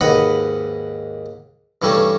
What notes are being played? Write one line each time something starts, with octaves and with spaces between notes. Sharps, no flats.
D#2 G#2 B4 D#5 F#5 B5
G2 E3 G3 A3 C#4